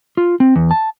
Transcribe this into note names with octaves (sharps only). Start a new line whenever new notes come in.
F4
C4
E2
A5